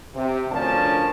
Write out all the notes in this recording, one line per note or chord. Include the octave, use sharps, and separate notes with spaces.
C3
D2 F3 C#4 D4 A#4 A5